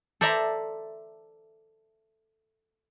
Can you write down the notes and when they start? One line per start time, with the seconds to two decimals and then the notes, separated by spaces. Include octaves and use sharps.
0.21 A4 C5 D5 E5 A#5